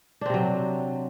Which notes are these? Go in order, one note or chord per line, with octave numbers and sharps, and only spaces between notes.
C3 F#3 C4 D4